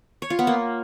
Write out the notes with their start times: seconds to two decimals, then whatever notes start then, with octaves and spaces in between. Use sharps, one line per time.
0.22 C#5
0.30 F4
0.39 B3
0.47 A#3